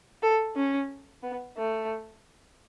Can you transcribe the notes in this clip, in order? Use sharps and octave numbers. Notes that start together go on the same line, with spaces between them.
A4
C#4
B3
A3